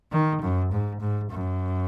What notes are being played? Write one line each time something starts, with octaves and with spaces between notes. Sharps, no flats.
D#3
F#2
G#2
G#2
F#2